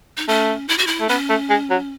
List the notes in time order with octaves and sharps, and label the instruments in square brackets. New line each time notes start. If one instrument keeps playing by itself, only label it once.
[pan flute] D#4
[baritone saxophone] A3 [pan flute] C#4
[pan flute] E4
F#4
E4
[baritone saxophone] A3
[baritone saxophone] B3 [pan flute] C#4
[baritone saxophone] A3
G#3
F#3